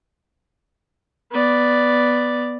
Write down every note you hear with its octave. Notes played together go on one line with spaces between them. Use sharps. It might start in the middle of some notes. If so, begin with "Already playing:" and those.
B3 D5